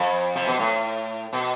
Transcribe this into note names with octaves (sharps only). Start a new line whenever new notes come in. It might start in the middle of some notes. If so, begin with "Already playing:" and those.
Already playing: F2
C3
B2
A2
B2